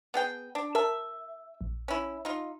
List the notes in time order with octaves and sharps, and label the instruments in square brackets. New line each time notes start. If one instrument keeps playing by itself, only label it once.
[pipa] B3 G#4 G5
D4
[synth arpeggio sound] A#4 A5 [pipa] E5
[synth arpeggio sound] A#1
[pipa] C#4 E4
D#4 F4